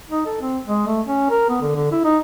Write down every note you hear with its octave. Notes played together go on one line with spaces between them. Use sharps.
D#4
A4
C4
G#3
A3
C#4
A#4
B3
D3
D3
E4
D#4